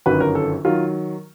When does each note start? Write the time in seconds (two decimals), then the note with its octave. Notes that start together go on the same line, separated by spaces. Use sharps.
0.06 G1 F#2 D#3 F#3 B4
0.20 A#4
0.35 A4
0.65 D#3 F#3 F4